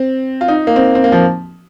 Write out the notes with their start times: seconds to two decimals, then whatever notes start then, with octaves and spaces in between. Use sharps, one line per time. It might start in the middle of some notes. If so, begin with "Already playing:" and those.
Already playing: C4
0.41 F4
0.48 D#4
0.67 A#3
0.76 C4
0.95 C4
1.04 A#3
1.12 F3